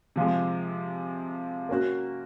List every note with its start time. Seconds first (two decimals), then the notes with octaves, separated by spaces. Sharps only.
0.16 C3 F3 G#3
1.69 A#3 C#4 F#4